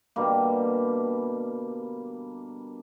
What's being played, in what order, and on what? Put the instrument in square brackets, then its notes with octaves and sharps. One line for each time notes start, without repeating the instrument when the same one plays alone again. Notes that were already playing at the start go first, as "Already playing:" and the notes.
[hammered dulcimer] B2 D3 G3 A#3